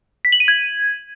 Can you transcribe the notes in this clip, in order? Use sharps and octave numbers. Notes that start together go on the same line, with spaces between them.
B6
F#7
D#7
G#6